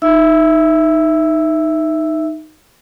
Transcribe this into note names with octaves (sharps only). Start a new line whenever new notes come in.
D#4 E5 E6